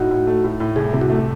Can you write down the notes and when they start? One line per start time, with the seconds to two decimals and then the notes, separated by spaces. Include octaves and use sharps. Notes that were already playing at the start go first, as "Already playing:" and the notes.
Already playing: A2 D#4 F#4
0.10 A2
0.27 A3
0.44 A2
0.60 A2
0.76 C2 G#4
0.93 C3
1.01 F#4
1.10 A3